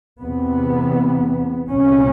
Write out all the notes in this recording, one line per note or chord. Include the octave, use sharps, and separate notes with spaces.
E2 C3 B3
C2 A#2 C#4